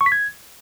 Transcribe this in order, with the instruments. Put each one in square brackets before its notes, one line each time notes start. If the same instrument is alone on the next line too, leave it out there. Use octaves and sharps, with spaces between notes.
[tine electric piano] C#6
B6
G#6